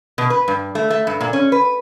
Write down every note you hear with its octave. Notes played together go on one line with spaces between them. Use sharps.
B2
B4
G2
A3
A3
G2
A#2
C#4
B4